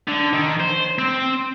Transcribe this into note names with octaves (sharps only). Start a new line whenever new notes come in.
D3
D#3
C5
C4